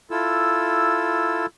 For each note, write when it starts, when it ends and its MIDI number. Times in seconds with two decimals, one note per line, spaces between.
0.11 1.46 64
0.11 1.46 65
0.11 1.46 69
0.11 1.46 88